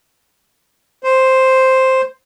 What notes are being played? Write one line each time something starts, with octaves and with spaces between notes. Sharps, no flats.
C5